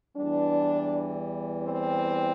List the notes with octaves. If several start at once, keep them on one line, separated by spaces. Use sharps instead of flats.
E2 E3 G3 D4
C4